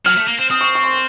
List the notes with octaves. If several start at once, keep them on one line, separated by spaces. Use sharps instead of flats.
F#3 F6
A3
A#3
C4
C4 D#6
C#6
C#6
C6